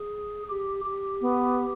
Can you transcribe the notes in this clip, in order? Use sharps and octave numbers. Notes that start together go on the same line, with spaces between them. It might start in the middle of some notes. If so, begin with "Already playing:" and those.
Already playing: G#4
G4
G4
B3